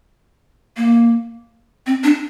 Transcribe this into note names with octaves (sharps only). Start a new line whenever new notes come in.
A#3
C4
D4